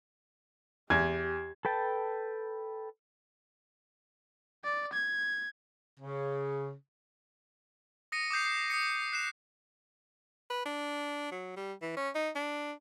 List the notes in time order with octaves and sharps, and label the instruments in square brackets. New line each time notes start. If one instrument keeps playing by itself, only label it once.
[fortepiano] E2 [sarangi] G4 [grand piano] G#6
[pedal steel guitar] A4 B4 G5 A5
[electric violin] D5
G#6
[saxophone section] C#3
[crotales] D#6 A#6 C#7 D#7
D6 D#6 G6 C7
C7
D#6 A#6 C#7
F#6 C7 E7
[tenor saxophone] B4
D4
F#3
G3
E3
C#4
D#4
D4